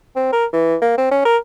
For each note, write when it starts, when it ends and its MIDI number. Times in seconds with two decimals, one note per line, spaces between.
0.16 0.32 60
0.32 0.45 70
0.53 0.76 52
0.81 0.96 58
0.98 1.09 60
1.11 1.24 61
1.25 1.37 70